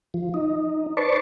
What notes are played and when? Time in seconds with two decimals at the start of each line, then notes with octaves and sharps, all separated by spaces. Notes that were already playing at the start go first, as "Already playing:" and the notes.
0.14 F3
0.34 D#4
0.97 B4 C5 D5 A5 C#6